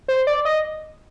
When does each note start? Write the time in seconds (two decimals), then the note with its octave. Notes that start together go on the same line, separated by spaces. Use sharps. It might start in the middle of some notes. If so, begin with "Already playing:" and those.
0.08 C5
0.27 D5
0.45 D#5